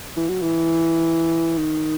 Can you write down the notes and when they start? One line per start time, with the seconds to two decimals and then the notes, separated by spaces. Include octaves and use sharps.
0.17 E3
0.29 F#3
0.42 E3
1.58 D#3